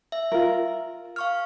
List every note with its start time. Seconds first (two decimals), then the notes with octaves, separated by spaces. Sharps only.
0.12 E5
0.32 F4 A#4
1.16 F5 C#6 F6